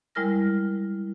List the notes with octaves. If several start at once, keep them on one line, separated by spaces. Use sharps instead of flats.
G3 G#3 E4 A#4 F6 A#6